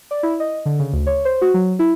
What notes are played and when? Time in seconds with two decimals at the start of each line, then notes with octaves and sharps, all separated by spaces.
0.11 D5
0.23 E4
0.40 D#5
0.66 D3
0.79 C#3
0.93 D2
1.07 C#5
1.25 C5
1.41 F#4
1.54 F#3
1.79 E4